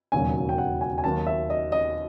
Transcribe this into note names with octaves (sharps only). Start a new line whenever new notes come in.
E1 D#2 C#3 F#3 G#5
G5
F#5
G#5
G#5
D#2 D#3 F#3 A5
E5
D#5
D#5